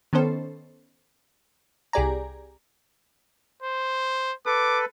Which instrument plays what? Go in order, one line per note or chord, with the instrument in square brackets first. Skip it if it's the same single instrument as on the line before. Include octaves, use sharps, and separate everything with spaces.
[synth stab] D#3 B3 C#4 A4 C5
C2 G4 G#4 D5 G#5 A#5
[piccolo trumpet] C5
[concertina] A4 B4 [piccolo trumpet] D6